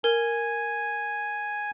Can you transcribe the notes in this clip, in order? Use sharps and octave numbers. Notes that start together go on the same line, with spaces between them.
A#4 G#5